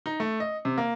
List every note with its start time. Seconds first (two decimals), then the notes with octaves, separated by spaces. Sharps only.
0.06 D#4
0.20 A3
0.40 D#5
0.65 C3
0.78 A#3